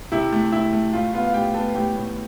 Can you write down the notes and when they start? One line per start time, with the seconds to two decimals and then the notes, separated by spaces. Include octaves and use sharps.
0.12 C3 E4 E5
0.32 A3
0.52 C3 E4 E5
0.73 A3
0.93 A2 F4 F5
1.13 B3 F4 F5
1.27 F5
1.33 A2 G4 G5
1.54 B3 A4 A5
1.74 A2 G4 G5
1.95 A2